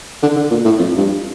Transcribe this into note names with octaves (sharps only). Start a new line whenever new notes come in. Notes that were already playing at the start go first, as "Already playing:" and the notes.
D3
D3
A#2
A2
F2
G2